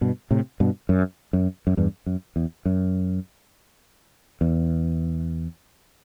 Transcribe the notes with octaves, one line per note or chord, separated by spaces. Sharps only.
G2 B2
A2 C3
G2 B2
F#2
F#2
F#2
E2 G2
F#2
E2
F#2
E2